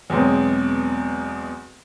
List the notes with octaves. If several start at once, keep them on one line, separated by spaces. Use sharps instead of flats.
E2 B2 F#3 G#3 B3 C4